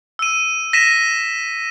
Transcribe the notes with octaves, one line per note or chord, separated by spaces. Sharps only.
E6 D#7
A#6 B6 D#7 E7